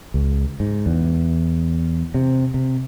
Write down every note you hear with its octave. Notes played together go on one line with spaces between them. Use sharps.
C#2
G#2
E2
C3
C3